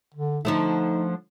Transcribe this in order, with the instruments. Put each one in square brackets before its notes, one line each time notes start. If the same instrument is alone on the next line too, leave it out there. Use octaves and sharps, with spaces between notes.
[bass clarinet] D3
[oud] D3 F3 A3 [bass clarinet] D#4